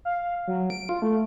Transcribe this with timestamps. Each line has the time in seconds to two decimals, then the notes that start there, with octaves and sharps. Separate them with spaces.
0.05 F5
0.48 F#3
0.70 D7
0.89 F4
1.02 A3